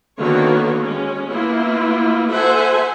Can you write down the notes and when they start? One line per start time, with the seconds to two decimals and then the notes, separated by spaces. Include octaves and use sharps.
0.20 D3 D#3 A#3 B3 F#4 C#5
0.80 G#3 C#4
1.30 A#3 B3 E4 F4
2.30 F#4 A4 C5 E5 F#5 G#5